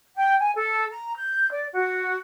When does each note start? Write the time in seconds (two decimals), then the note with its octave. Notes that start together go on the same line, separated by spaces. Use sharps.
0.16 G5
0.39 G#5
0.56 A4
0.92 A#5
1.16 G6
1.51 D5
1.74 F#4